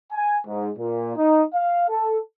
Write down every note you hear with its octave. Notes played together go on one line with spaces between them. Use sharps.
G#5
G#2
A#2
D#4
F5
A4